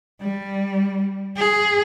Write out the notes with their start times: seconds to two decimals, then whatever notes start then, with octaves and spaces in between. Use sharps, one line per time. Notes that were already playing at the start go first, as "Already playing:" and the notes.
0.21 G3
1.37 G#4